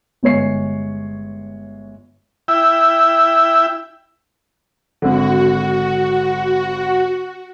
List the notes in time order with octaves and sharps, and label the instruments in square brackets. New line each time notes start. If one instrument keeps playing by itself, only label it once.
[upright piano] G1 G#3 C#5 C7
[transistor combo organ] E4 E5 G5
[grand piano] G#1 D3 [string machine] F#4